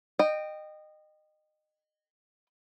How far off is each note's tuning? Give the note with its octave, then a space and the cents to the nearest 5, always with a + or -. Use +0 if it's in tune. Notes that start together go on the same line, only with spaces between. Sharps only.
D#5 -20 G5 +0